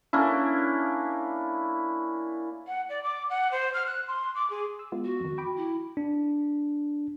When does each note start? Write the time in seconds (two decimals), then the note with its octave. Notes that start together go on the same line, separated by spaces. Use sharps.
0.13 A#3 C#4 D4 E4
2.67 F#5
2.89 D5
3.04 D6
3.30 F#5
3.52 C5
3.74 F6
3.86 F#6
4.08 C6
4.35 D6
4.50 G#4
4.79 E6
4.92 G#3 B3 F4
5.04 F#4
5.20 F2 D#3
5.38 G5 B5 D6
5.57 E4
5.97 D4